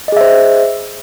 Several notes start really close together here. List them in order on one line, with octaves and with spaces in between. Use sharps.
D#5 G#4 E5 C5